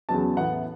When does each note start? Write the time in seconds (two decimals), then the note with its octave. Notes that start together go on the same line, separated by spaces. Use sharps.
0.09 E2 C#3 F#3 B3 A5
0.37 A2 E3 B3 F#5